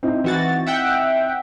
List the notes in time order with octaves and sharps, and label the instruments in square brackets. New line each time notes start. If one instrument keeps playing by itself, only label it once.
[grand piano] C4 D#4 E4
[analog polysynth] E3 F#4 A6
E5 F#5 G5